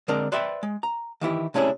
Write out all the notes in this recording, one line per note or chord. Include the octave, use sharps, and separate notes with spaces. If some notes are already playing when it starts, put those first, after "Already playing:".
D3 G#3 C4 D4 A#4
B4 C5 D5 E5 G5 B5
G#3
A#5
D#3 E3 E4 G4
C3 A3 C#4 D4 E4 G#4